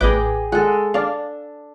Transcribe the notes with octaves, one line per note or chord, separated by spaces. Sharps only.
A1 G#4 B4 D#5 G5 D6
G#3 A4 F#5
D4 D5 F5